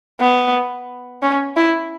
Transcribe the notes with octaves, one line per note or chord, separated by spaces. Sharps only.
B3
C#4
E4